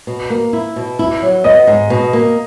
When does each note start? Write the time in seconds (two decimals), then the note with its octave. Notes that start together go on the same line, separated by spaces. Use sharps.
0.07 B2
0.30 A#3
0.53 E4
0.76 B2
0.99 E4
1.22 F#3
1.44 B3 D#5
1.67 G#2
1.90 B2
2.13 A#3